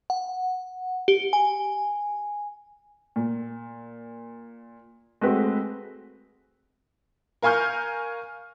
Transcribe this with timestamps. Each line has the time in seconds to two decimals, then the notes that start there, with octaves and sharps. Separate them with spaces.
0.10 F#5
1.08 G4
1.33 G#5
3.16 A#2
5.21 G#3 A3 C4 F#4 B4
7.42 A#4 F5 G#5 C#6 F6 G6